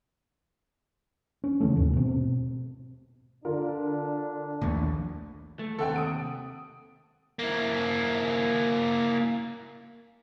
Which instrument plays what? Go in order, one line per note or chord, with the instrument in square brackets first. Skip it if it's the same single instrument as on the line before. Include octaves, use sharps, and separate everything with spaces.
[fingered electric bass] C#4
C#3 E3 A3
D#2 G#2 C3
B2 C4
[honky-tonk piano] D3 F4 A#4 [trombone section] D4
[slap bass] A#1 D#2 A3
[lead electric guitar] A3
[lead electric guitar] D#2 C3 [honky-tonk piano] A4 F#5 G5
[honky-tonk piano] D#6 D7
[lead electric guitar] A#3 E4